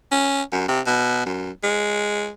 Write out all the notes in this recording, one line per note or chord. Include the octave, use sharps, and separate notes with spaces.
C#4
F#2
C3
B2
F#2
G#3